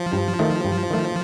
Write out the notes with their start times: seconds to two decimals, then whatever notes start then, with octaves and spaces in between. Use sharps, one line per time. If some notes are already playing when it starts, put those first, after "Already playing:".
Already playing: F3
0.13 G2
0.39 D#3 A3
0.65 G2
0.90 D#3 A3